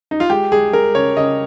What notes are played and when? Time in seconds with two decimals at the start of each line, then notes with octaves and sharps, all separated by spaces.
0.11 D#4
0.20 F4
0.30 G#3 G4
0.52 G#3 G#4
0.73 G#3 A#4
0.95 C#3 C#5
1.17 C#3 D#5